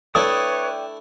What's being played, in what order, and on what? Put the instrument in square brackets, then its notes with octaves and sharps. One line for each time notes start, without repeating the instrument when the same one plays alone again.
[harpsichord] A3 D4 E4 [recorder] B4 [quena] C#5 [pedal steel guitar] D5 G5 D#6